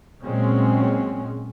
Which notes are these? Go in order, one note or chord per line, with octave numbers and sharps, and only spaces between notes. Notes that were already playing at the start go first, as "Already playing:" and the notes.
A#2 F#3 G#3 C4 C#4